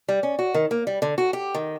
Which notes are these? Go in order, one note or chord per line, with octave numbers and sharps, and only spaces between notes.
G3
C#4
F#4
D#3
A#3
G3
D3
F#4
G4
D#3